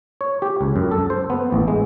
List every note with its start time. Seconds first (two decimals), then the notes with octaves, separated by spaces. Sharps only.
0.21 C#5
0.42 G4
0.61 C#2
0.76 F#2
0.91 A4
1.10 C5
1.30 B3
1.52 A1
1.68 G#3